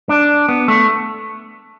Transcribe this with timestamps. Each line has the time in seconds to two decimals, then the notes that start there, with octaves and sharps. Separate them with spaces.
0.09 D4
0.49 B3
0.68 A3